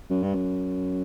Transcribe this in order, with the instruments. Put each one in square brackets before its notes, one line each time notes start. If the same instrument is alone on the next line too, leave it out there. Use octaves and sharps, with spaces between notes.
[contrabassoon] F#2
G2
F#2